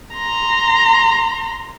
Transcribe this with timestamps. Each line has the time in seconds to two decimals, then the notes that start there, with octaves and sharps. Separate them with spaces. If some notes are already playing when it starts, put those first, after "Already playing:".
0.15 A#5 C6